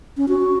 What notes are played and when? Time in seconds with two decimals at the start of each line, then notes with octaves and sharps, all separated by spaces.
0.17 C#4
0.29 F#4